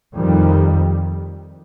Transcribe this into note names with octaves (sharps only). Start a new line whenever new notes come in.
F2 D#3 G3